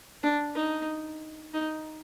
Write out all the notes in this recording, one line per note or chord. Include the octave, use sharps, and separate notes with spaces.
D4
D#4
D#4